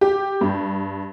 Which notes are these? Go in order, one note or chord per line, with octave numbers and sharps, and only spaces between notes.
G4
G2